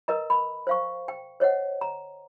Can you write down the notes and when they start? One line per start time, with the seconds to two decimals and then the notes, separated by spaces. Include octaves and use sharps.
0.08 A#4 B4 D#5 A#5
0.30 B5
0.67 C5 F5 C#6
1.08 G5
1.40 C5 C#5 D#5 F#5
1.81 A#5